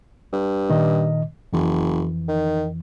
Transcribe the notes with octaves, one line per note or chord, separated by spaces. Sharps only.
G2
A#2 D#3 D#5
F#1 F2 E3
D#3